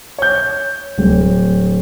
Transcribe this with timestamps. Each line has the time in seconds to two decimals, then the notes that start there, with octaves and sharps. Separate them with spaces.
0.18 C#5 G6
0.98 D1